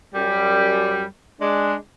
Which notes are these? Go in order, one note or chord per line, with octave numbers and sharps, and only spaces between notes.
F#2 G3
G#3 D4